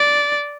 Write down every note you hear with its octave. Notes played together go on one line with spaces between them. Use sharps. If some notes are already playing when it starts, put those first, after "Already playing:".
Already playing: D5